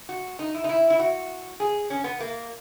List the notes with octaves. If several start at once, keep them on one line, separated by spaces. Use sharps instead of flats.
F#4
D#4
E4
D#4
E4
E4
F#4
G#4
C#4
B3
A#3